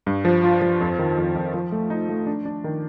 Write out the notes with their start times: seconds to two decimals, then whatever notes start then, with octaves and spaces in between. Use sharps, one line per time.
0.07 G2
0.25 F3
0.44 F4
0.62 F3
0.80 F2
0.99 D#3
1.17 F2
1.35 F2
1.54 F3
1.72 A3
1.90 D#4
2.09 A3
2.27 D4
2.45 D4
2.64 D#3